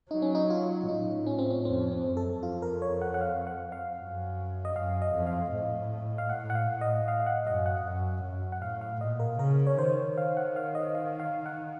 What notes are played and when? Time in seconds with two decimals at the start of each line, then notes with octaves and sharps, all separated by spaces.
0.11 F#3 D#4
0.22 C#4
0.35 D#4
0.50 F4
0.88 A2 D#4
1.26 C#4
1.39 C4
1.50 C#4
1.65 F2 C4
1.91 C4
2.04 F#2
2.17 A4
2.43 F2 F4
2.62 A#4
2.82 C#5
3.02 F#5
3.14 F#5
3.21 F5
3.47 F#5
3.72 F5
3.98 F#2
4.65 D#5
4.75 F#2 F5
5.02 D#5
5.14 F2
5.27 F5
5.53 A2
6.18 F5
6.29 A2 F#5
6.50 F#5
6.55 F5
6.69 A2
6.81 D#5
7.08 F5
7.20 F5
7.26 F#5
7.46 F#2 D#5
7.66 F#5
7.84 F#2
8.24 F#2
8.52 F#5
8.62 A2 F5
8.81 F5
9.01 A#2 D#5
9.20 A#4
9.39 C#3 A#4
9.67 C#5
9.78 D#3 C5
10.16 D#3 F5
10.37 F#5
10.56 F5
10.75 D#5
10.95 F5
11.20 F5
11.46 F#5